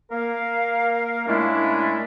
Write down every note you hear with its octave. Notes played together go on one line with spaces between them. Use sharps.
A#3 A#4 F5
A#2 G#3 A3 C#4 D4 E4